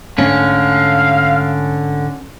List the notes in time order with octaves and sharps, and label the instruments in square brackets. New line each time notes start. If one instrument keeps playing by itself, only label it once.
[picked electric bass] G#2 A3 [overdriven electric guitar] D3 [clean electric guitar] C#4 [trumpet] F5